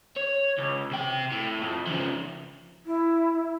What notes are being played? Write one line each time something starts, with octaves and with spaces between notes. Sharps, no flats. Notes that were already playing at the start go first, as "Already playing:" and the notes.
C#5
C#2
C3 G5
A2
F2
C#3 F3
E4